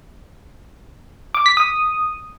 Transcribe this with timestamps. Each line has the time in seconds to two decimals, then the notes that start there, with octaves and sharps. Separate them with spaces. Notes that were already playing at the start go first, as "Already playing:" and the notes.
1.35 D6
1.46 B6
1.57 D#6